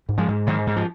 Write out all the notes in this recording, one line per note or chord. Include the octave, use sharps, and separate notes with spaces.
G#2
F3 G#3
G#2
G#2 D#3 F#3
G#2
F3